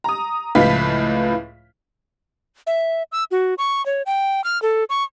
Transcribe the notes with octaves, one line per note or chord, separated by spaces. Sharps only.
A#5 D#6
C#2 A2 F3 B4 F5 B6
E5
E6
F#4
C#6
C#5
G5
F6
A4
C#6